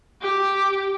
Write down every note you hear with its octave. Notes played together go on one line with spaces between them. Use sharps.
G4